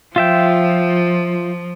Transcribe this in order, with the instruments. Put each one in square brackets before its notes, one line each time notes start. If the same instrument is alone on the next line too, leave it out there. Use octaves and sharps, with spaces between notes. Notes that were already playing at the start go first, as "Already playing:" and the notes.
[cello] F3 [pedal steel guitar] F4 E5 G5